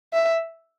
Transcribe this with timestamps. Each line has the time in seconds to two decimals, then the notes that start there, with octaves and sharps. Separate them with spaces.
0.13 E5